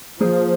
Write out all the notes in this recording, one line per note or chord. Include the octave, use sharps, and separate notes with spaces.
F3 A#3 G#4 C5